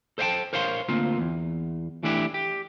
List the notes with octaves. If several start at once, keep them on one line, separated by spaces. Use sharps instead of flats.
A4 C5 D#5 F5 G5 A5
A#4 C5 C#5 F5 F#5 C6
D2 A#3 C4 F4
E2
E3 A3 D4 E4 G4
G4